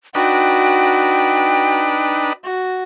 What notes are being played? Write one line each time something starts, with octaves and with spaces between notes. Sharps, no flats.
D4 D#4 F#4 B4 G5
F#4